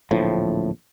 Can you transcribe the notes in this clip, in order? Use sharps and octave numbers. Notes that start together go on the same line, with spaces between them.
D1 A#1 A2 F3